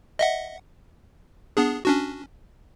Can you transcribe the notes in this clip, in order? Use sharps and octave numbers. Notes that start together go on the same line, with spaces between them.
D#5 E5 F#5
B3 D4 G#4
C#4 D4 F#4